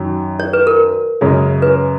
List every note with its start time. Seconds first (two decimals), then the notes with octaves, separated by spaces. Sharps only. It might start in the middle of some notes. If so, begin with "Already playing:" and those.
Already playing: F#2 D#3 F#3
0.40 C#5
0.53 B4
0.67 A#4
1.21 F#2 C#3 G#3 C#4
1.62 B4